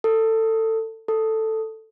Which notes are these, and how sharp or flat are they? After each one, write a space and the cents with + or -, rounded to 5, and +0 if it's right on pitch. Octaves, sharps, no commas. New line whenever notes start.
A4 +20
A4 +5